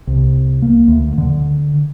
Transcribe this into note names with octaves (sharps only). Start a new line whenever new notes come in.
C2
A#3
D2
D3